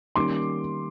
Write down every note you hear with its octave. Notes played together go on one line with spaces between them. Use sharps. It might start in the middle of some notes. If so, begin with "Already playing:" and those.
D#3 G3 A#3 C#4 C6 D6